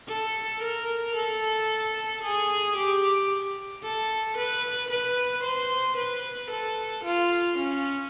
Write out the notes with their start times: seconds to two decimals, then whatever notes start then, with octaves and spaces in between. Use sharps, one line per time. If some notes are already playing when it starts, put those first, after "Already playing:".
0.08 A4
0.63 A#4
1.16 A4
2.23 G#4
2.76 G4
3.83 A4
4.37 B4
4.90 B4
5.43 C5
5.97 B4
6.51 A4
7.04 F4
7.58 C#4